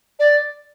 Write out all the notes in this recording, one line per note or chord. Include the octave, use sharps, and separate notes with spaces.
D5